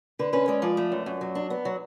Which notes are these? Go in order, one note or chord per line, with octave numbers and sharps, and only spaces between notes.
D3 B4
C#4 B4
G#3 D5
F3 D5
A3
F#2
F#2
F#3
D4
B3
F#3